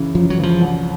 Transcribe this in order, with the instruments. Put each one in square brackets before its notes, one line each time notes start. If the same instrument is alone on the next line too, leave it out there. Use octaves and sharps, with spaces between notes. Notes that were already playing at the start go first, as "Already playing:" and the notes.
Already playing: [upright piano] F#2 C#3 E3
[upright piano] F#2 [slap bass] F3
[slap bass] F#3
[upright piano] C#3 E3 [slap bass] F3
[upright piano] C2